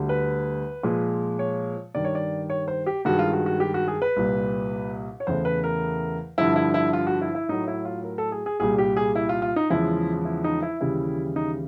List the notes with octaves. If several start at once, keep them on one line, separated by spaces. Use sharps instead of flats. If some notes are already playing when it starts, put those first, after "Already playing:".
Already playing: D2 D3 G3
B4
A#2 F3 G#3
C#5
G2 D#3 G3 D5
C#5
D5
C#5
C5
G4
G2 D#3 G#3 F#4
F4
F#4
F#4
G4
F#4
G#4
B4
C2 A#2 G3
C#5
E2 C#3 E3 A3 C5
B4
A#4
G2 D3 F3 E4
E4
E4
F4
F#4
E4
E4
A2 F#3 A3 D#4
E4
F4
A#4
A4
G#4
G#4
C2 A#2 G3 G#4
G4
G#4
E4
F4
F4
D#4
E2 C#3 F3 G#3 E4
E4
D#4
E4
D#2 C#3 E3 G3 E4
D#4